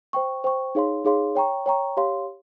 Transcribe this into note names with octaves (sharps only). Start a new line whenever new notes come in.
C5 G5 C#6
C5 G5 C#6
D#4 G#4 C#5 F5 C6
D#4 G#4 C#5 F5 C6
C#5 G5 A#5 C#6
C#5 G5 A#5 C#6
G4 C#5 F5 C6